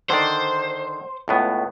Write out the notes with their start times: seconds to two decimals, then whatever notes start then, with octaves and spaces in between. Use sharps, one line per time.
0.10 D3 D#3 C5 D5
1.28 C#2 A2 B3